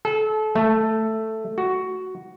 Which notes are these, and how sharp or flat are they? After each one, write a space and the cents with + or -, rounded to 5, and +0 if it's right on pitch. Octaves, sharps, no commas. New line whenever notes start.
A4 -30
A3 +5
F#4 +10